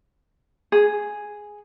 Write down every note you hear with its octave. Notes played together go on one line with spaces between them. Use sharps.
G#4